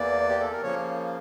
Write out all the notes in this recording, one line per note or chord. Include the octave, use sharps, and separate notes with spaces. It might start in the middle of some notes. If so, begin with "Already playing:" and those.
Already playing: E2 E3 A#3 D5
G4
A4
A#4
C#3 F3 A#3 C#5